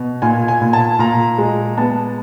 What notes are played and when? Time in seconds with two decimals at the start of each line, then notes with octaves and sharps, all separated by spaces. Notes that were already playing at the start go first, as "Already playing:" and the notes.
Already playing: B2
0.22 A#2 G#5
0.48 G#5
0.61 A#2
0.73 A5
0.99 A#2 A#5
1.38 G#3
1.78 B3 A5